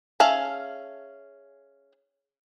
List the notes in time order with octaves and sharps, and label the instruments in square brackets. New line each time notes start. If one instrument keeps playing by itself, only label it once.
[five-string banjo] C#4 G#4 E5 F5 A5